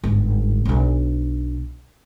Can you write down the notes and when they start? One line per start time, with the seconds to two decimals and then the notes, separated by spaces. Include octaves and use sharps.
0.04 G1 G#2
0.65 B1 D4